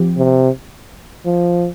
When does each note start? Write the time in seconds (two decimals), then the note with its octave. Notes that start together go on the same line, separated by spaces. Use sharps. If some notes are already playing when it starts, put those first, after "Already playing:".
Already playing: F3 C4 G4
0.17 C3
1.26 F3